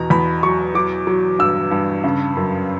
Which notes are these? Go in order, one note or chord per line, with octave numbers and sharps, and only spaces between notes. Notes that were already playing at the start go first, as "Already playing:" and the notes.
Already playing: E2 B2 A#5
E2 B5
F#3 C#6
F#3 D6
F#3
G2 E6
G2
C#3
F#2